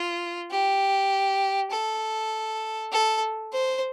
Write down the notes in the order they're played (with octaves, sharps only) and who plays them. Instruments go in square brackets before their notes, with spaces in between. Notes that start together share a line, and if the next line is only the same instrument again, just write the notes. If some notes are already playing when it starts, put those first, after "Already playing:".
Already playing: [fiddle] F4
G4
A4
A4
C5